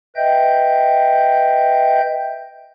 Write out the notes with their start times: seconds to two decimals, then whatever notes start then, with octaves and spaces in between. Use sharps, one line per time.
0.16 B4 D#5 E5 G5 G6